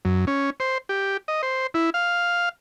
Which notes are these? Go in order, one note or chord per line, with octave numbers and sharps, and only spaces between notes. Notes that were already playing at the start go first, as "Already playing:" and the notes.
F#2
C#4
C5
G4
D#5
C5
E4
F5